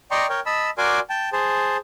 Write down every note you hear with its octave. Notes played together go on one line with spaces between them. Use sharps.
D5 D#5 G5 A#5 C6 C#6
A#4 C#5 G5
D#5 A5 B5 E6
F#4 A#4 D5 G#5 C6 D6
G5 A5
G#4 C5 A5